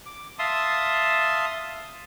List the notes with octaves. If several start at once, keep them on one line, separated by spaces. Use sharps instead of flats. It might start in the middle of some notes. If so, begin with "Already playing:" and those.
D6
E5 F5 A5 C6 D#6